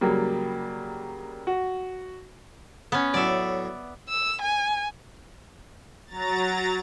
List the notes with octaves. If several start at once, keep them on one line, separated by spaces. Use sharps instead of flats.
C#3 F#3 G3 A#3
F#4
B3 C#4
A2 F#3 D5 E5
E6
G#5
F#3 A#5 A6